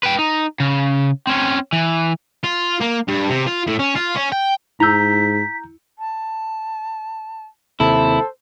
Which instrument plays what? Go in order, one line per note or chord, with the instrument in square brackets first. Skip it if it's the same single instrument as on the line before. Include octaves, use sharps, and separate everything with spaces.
[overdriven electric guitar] B4 G5
D#4
C#3
C4 C#4
E3
[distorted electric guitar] F4
A#3
G2
C3
F4
A2
C#4
F4
C#4
G5
[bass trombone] G#2 [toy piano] E4 E6 [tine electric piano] A#5 G6 [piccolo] B6
[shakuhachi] A5
[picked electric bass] D#2 C3 [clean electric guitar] E4 [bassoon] A4 [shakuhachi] C5